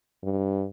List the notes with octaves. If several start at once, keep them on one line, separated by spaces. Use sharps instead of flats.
G2